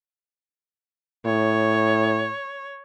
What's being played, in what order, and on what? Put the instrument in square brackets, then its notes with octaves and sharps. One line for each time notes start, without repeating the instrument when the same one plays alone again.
[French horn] A2 [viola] C#5